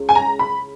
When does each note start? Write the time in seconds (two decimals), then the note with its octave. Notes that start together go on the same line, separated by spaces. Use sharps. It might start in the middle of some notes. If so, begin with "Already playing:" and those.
Already playing: C#2 C#4
0.09 G#5
0.15 A#5
0.39 B5